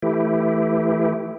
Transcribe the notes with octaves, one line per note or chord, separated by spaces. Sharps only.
E3 A3 E4 G4